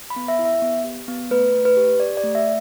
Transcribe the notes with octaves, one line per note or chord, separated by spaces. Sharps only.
B5
B3
E5
E4
E5
B3
G4
B3
A3 B4
A3
B4
G4
G4 D5
D5
A3
E5